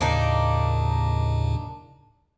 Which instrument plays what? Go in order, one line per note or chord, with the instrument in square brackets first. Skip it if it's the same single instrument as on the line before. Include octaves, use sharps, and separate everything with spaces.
[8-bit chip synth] D#2 A2 C#3 [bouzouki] A#3 D4 D#4